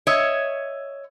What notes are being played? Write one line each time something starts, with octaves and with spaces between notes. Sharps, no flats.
C#5 D#5 E5